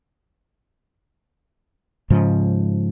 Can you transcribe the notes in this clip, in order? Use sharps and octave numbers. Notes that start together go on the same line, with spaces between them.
G#2 C#3 F3